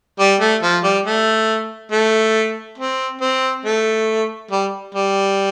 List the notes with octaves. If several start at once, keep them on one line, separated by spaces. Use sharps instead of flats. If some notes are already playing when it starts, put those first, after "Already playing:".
G3
A3
F3
G3
A3
A3
C4
C4
A3
G3
G3